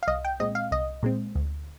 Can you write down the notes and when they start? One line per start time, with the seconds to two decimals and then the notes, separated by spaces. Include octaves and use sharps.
0.03 F5
0.08 C2 D#5
0.25 G5
0.40 A#2 G#3 C4 D#5
0.55 F5
0.71 C2 D#5
1.03 A#2 G#3 C4
1.35 D2